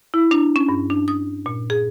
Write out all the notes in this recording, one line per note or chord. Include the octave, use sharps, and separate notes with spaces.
E4
D4
C#4
G2
D4
D#6
A#2
G#4